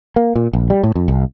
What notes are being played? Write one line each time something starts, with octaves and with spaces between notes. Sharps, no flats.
A#3
A#2
A#1
G3
A2
F2
C2